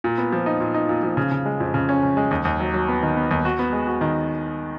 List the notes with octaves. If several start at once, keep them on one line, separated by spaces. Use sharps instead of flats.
A#2
B3
F3
D#4
A#2
D#4
A#2
F3
C#3
C#3
G#3
F2
C#3
C#4
C#3
G#3
D#2
D#2
F#3
F#3
B3
D#3
B3
D#2
F#4
B3
G#3
F#4
D#3